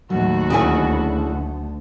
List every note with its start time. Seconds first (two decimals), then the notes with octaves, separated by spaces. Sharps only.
0.10 D#2 A2 F#3 A3 F#4
0.50 D2 C#3 A3 E4 G#5